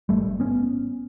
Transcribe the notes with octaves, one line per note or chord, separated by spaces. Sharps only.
G#1 G3 A3
G#1
G#1 B3 C#4